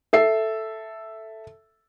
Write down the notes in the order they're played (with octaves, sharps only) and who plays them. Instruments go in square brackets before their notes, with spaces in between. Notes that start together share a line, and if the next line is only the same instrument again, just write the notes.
[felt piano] A4 E5 C7